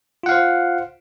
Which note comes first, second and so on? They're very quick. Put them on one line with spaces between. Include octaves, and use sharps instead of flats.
F4 F#5 F5 C5